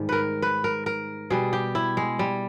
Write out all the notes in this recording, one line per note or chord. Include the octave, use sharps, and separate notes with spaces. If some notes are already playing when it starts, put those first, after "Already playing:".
Already playing: G#2 D#3 G3
A#4 B4
B4
A#4
A#4
B2 G3 G#4
G4
E4
G#3
G3